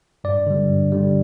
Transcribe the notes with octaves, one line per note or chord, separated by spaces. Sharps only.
G2 D5
D3 G3
G2
D3 G3